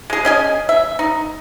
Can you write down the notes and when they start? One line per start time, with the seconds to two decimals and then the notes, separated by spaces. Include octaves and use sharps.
0.10 G#3 G#4
0.25 C#4 D#5 G#5
0.69 E5
0.99 D#4